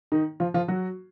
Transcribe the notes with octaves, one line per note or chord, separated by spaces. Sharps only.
D#3 D#4
F3 F4
F3 F4
F#3 F#4